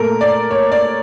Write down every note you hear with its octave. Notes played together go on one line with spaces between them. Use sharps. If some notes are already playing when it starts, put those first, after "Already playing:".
Already playing: A#2 A3 A#4
D5
C#5
D5